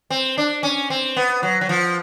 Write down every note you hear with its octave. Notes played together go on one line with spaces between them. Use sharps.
C4
D4
C#4
C4
B3
F#3
F#3
F3